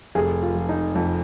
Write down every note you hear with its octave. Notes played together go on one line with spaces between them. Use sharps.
F1 G#4
F4
F3
D#4
F2